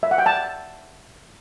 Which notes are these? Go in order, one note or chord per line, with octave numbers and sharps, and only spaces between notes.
E5
F#5
G5
A5